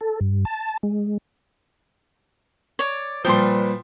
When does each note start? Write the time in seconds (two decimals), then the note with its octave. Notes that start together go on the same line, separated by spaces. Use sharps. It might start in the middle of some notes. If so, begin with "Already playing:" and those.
0.01 A4
0.21 G2
0.45 A5
0.83 G#3
2.79 C#5 D5
3.25 A#2 F3 G3 B4 G5 C6